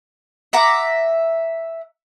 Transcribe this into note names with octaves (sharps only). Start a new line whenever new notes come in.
E5 F#5 A#5 D6